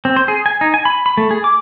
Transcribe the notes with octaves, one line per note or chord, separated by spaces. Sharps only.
C4
C5
G#4
G#5
D#4
G#5
B5
B5
A3
G#4
D6